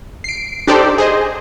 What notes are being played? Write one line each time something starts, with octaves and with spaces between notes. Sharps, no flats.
C7 D7
D4 D#4 G4 A4 C5 D5
G#4 C5 D#5